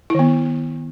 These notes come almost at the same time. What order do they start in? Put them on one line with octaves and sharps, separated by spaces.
E4 D#3 B3